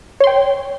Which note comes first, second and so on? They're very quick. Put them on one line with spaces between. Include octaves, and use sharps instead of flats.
C#5 C6 G5